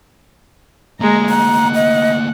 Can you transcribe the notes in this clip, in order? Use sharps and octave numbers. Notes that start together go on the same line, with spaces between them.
D2 G#3 A#3 A#5
F#5 A#5
D#5